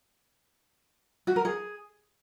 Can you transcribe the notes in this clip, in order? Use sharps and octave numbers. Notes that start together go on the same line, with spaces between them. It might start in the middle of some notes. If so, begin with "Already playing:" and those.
F#4
A#4
G#4